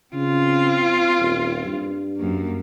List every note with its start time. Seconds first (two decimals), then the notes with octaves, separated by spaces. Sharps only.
0.14 C#3 C4 F4
1.20 D#1
1.66 G2
2.17 F#2 A#3